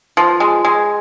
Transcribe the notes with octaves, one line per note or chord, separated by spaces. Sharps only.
F3
G#3
G#3